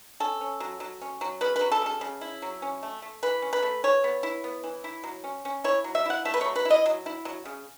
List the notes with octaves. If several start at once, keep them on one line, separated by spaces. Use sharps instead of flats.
C#4 A4
C#4
F#3
F#3
C#4
F#3
C#3 B4
B4
F#3
A4
C#3 A4
C#3
E4
F#3
C#4
A3
A3
E3 B4
C#4
B4
A3
E3 C#5
B3
E4
B3
E3
E4
F#3
C#4
C#4
E4 C#5
F#3
E5
E4 F#5
A3 E5
B4
F#3 C#5
B4
E4
D#5
F#3
E4
F#3
C#3